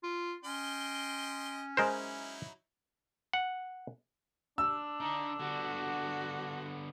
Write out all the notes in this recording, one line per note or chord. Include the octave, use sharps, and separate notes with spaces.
F4
C#4 D#5 G5 C6
F#3 G#3 D#4 E4 A#4 C5
F#5
D4 E6
D3 D#4
D3 B3 F#4